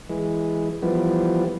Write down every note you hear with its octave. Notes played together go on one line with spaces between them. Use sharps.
E3 G#3
E3 F3 G3 B3